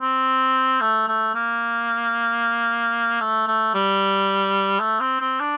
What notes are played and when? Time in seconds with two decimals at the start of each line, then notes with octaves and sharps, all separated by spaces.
0.01 C4
0.81 A3
1.08 A3
1.34 A#3
3.20 A3
3.47 A3
3.74 G3
4.80 A3
5.00 C4
5.20 C4
5.40 D4